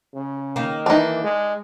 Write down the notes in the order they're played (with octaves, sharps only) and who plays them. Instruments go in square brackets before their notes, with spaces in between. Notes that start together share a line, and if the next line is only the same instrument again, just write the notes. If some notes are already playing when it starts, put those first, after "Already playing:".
[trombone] C#3
[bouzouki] D#3 A#3
[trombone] E3 [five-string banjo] D4 D#4
[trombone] G#3